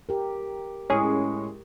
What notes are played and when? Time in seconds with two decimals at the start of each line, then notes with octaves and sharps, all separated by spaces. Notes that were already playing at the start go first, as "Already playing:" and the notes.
0.09 G4 A#4
0.90 A2 G#3 C#4 G#4 C#6